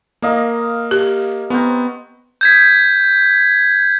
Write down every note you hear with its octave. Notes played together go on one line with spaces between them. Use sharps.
A#3 A#4 D#5 F5
G4
B3 C4 A#4 C#6
G6 G#6 B6